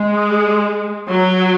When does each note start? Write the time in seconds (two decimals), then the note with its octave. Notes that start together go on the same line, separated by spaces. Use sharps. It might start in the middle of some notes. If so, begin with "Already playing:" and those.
Already playing: G#3
1.09 F#3